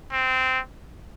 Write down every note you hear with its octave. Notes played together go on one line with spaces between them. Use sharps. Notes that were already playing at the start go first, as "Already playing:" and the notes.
C4